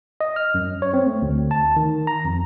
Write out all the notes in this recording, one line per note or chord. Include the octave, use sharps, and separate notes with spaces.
D#5
F6
F#2
C#5
C4
A3
D2
A5
D#3
A#5
F2